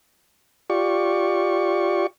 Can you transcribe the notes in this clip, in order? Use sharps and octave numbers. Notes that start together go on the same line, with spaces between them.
F4 G4 D5 C#6